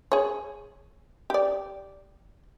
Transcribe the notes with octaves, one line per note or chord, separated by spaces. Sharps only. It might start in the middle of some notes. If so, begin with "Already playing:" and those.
G#4 C#5
G4 D5